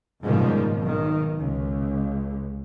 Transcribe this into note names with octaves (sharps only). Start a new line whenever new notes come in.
F#1 G#2 B2 D#3 F3 G3
B1 D#3
C#2